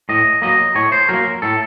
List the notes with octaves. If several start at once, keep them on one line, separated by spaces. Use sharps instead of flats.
A2 D#5
F#3 A#3 D#5
A2 C#5
C5
F#3 A#3 A#4
A2 A4